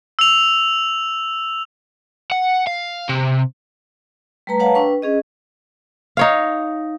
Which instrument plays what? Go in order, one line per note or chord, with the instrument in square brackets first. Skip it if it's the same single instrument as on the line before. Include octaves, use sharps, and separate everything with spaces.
[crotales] E6 F7
[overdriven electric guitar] F#5
F5
C3
[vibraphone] G3 A3 B4 A#5
B4 C#5 F5 F#5 A5 A#5
D4 B4 G5 C#6
C#4 G#4 D#5
[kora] D#4 C#5 F5